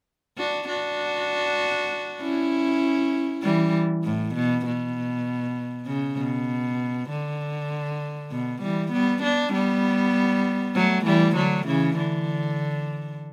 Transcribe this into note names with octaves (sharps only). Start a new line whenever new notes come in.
D4 F#4
D4 F#4
C#4 E4
E3 G3
A2
B2
B2
C#3
B2
D3
B2
E3 G3
G3 B3
B3 D4
G3 B3
F#3 A3
E3 G3
D3 F#3
C#3 E3
D3